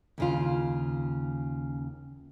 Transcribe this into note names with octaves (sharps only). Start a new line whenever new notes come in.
D#2 C#3 F4